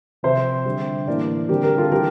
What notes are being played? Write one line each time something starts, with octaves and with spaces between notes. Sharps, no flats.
C3 F3 C4 C5 E5
D3 G3 D4
A2 E3 A#3 D4 A#4 D5
D3 G3 C4 G4 A#4
G4 A#4
F4 A4
E3 G3 G4 A#4